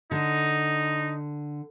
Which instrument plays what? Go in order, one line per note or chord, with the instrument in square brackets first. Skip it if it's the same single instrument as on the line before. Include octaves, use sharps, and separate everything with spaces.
[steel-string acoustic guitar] D3 [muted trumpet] D#4